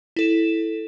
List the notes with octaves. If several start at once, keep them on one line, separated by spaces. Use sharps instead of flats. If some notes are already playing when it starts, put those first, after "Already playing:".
E4 A4 E7